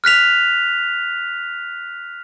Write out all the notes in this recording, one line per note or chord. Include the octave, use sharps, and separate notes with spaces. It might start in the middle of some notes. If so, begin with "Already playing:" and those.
F6 F#6 B6 F7